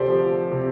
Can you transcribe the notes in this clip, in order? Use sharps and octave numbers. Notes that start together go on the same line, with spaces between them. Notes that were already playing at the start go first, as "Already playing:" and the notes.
Already playing: D2 C3 G4 A4 C5 D5
F3
C3